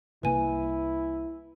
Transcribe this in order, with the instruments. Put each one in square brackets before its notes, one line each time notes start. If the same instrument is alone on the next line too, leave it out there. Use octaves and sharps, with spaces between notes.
[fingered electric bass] C2 C3 A#3 [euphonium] E4 [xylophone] B4 G#5